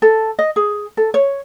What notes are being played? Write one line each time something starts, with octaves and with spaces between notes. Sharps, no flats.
A4
D#5
G#4
A4
C#5